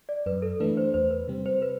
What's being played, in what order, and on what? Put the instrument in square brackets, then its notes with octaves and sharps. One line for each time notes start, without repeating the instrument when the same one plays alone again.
[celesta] D5
[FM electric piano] F#2 [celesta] B4
[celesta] A4
[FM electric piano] E3 A3 D4 [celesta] B4
[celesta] C5
[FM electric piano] E2 [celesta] C5
[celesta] B4
[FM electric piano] C3 G3 C4
[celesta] C5
B4